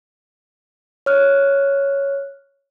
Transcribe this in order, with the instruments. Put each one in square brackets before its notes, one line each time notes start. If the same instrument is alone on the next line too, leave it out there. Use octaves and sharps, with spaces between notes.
[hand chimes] C#5 F6 F#6